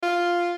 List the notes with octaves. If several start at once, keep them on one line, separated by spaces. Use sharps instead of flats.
F4